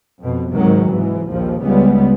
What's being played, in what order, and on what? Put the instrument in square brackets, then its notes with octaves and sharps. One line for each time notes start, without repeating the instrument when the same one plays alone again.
[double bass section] F2 B2
C#2 G#2 C3 D#3 F#3
G#2 E3
A#1 D#2 F3
C#2 C#3 G3 G#3 B3